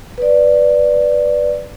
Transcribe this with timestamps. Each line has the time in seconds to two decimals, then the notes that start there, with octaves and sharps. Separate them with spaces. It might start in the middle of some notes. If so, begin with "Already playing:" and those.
0.18 B4 D5